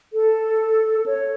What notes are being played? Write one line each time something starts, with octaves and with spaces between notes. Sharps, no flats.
A4
C#5